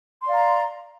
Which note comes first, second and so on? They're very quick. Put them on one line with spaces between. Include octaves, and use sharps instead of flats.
C6 D5 F5 A#5